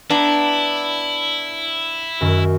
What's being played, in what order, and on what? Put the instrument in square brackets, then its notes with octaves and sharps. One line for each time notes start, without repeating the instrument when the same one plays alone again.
[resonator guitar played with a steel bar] B3 D4 [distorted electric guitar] E4 [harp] A#5 D6 B6
[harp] F#2 D#3 F#3